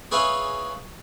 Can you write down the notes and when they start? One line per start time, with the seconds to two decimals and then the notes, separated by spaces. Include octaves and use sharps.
0.11 G#4 B4 C#5 E5 F5